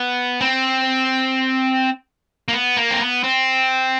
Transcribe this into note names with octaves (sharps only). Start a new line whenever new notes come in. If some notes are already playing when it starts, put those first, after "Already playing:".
Already playing: B3
C4
A#3
B3
A#3
C4
B3
C4